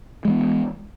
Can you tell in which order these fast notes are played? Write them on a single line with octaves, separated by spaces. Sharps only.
G#3 E3 B3